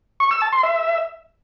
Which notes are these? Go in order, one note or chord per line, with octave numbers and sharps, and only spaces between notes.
C#6
E6
A5
C6
E5